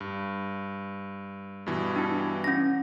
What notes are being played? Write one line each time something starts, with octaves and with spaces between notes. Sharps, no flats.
G2
G2 B2 E3
D4 E4
C#4 A#6